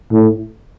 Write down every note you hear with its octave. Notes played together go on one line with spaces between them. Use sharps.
A2